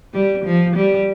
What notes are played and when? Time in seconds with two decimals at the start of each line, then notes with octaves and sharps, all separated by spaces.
0.13 G3
0.45 F3
0.76 G3